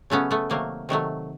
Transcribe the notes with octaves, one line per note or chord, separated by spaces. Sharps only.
C#3 F#3 A3 B3 C#4
A3 B3
C3 D#3 F#3 A3 A#3
C3 D#3 F#3 A3